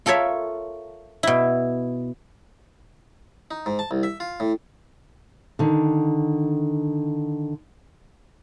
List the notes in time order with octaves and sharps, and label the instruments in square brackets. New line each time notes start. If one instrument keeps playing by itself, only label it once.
[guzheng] F4 A4 A#4 C#5 E5
B2 E4
[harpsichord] D#4
G#2
A5
C2
E5
F4
A2
[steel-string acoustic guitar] D3 D#3